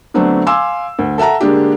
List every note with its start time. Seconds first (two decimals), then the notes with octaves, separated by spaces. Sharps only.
0.14 D3 F#3 A3 B3 C4 D4
0.47 F5 G#5 C6 D6 E6
0.99 D2
1.18 A4 E5 F#5 A5 A#5
1.40 D3 G#3 A#3 D4 G4